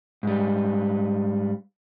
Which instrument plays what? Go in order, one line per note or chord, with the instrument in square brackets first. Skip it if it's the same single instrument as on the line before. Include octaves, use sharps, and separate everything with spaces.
[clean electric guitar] G#2 G3